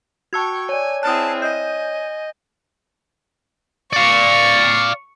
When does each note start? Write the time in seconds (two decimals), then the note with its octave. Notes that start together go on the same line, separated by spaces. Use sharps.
0.33 F#4 G5 A5 C#6 E6 G#6
0.69 C#5 D5 G#5
1.03 C4 E4 G#4 A5 D#6 F6 F#6
1.42 D#5 G#5 G6
3.93 D5 F5 C#6